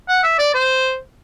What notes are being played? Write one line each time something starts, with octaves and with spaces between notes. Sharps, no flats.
F#5
E5
D5
C5